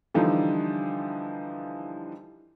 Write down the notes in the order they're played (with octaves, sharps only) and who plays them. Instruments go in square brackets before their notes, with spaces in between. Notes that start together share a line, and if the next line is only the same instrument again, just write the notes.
[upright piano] D3 E3 F3 G3 D#4